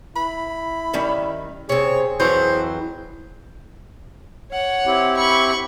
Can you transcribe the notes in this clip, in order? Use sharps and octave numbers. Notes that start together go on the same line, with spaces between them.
E4 B5
D#3 G3 C#4
C3 C4 G#4 C#5
F2 E3 F#3 C5
C#5 F#5
C4 E4 G4
B5 C#6